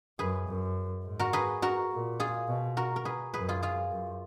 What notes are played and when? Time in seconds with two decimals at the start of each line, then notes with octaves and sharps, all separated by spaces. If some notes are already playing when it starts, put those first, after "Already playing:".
0.19 F#2 G#4 B4
0.48 F#2
1.05 G#2
1.19 F#4 A#4
1.33 G#4 B4
1.62 F#4 A#4
1.92 A#2
2.20 F4 G#4
2.48 B2
2.77 F#4 A#4
2.96 A#4
3.05 G#4 B4
3.34 F#2 G#4 B4
3.49 F4 G#4
3.63 F4 G#4
3.91 F#2